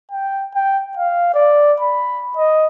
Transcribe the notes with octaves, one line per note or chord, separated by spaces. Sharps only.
G5
G5
F5
D5
B5
D#5